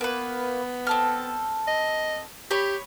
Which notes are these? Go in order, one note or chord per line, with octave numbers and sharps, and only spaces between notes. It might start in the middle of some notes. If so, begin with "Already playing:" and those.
A#3 B3 B4
C4 A4 F6
D#5
G4 C#5 B5